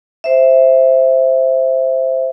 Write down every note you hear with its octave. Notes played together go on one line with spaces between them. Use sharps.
C5 E5